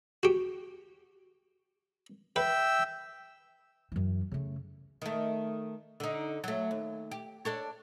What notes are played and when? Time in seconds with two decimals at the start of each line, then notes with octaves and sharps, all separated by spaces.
0.23 F#4 G4
2.36 B4 E5 G5 E6
3.92 F#2 E3
4.32 C#3 A3
5.02 D#3 A3
6.00 D3 D#4
6.44 F#3 A3
6.71 D#2
7.11 G4
7.45 D4 A4 C#5